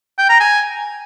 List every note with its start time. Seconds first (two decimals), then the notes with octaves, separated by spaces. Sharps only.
0.18 G5
0.29 A#5
0.40 G#5